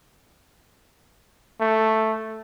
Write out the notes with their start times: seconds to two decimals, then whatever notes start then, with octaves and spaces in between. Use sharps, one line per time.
1.60 A3